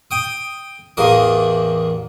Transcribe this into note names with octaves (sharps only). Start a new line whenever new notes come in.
G5 D#6
A1 E2 A#3 D#6